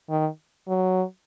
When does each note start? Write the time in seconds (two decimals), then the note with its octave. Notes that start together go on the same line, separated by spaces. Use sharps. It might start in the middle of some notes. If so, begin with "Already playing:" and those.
0.09 D#3
0.68 F#3